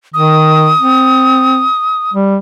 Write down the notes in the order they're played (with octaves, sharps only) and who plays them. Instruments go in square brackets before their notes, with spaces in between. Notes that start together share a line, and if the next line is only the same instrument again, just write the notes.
[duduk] D#3 [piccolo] D#6
[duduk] C4
G3